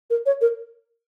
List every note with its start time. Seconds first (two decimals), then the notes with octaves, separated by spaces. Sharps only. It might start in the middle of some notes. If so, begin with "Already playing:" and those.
0.10 A#4
0.26 C#5
0.41 A#4